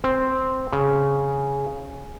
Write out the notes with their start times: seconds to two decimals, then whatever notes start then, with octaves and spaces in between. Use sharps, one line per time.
0.04 C4
0.72 C#3